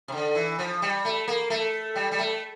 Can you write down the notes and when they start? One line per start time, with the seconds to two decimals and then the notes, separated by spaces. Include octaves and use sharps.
0.08 C3
0.12 D3
0.35 E3
0.59 F3
0.82 G3
1.05 A3
1.28 A#3
1.50 A3
1.96 G3
2.12 G3
2.18 A3